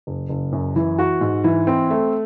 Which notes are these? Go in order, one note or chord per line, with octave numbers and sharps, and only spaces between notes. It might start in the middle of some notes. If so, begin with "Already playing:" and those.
F#1
F#1
F#2
E3
F#4
G#2
E3
C4
A3